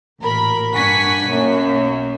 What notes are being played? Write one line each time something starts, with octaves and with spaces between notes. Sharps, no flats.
A1 A#2 A#4 B5
G2 D4 F#5 G#5 C#6 B6
B1 F#2 A#3